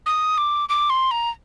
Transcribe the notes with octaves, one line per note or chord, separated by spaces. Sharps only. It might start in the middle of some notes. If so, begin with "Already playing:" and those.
D#6
D6
D6
C6
A#5